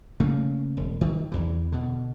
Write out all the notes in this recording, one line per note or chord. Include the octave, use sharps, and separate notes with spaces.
C#3 A3 A#3
E1
D#3
E2 E3
B2 D3